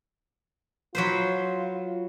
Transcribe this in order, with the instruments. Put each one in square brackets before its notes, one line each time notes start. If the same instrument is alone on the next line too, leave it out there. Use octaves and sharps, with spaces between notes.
[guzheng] F#3 B4 C5 [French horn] F4